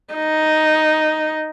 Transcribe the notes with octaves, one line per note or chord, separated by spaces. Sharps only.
D#4